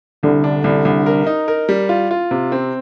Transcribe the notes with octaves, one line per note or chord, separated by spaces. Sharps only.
C2 D3
D4
C2
C2
A#4
D#4
A#4
G3
F4
F4
C3
C4